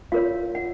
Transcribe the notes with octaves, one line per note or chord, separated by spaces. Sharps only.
F4 A#4 C#5 F5
F#5